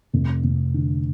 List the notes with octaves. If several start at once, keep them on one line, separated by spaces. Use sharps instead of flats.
F1
F1
D3